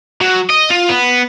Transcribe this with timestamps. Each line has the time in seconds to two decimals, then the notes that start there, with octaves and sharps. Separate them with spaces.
0.21 F#3
0.50 D#5
0.70 F4
0.89 B3